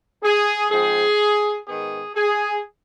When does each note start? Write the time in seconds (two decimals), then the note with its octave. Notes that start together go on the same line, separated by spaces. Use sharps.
0.23 G#4
0.71 G#2 F3 C4 G#4
1.67 G#2 D#3 B3 G#4
2.15 G#4